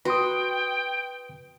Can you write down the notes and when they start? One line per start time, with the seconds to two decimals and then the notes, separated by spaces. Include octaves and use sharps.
0.05 F#4 B4 G5 C6 D#6